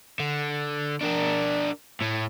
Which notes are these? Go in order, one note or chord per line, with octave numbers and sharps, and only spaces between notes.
D3
D4 A#4
A2